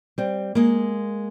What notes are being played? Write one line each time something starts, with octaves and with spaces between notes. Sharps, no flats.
G3 C4
G#3 A#3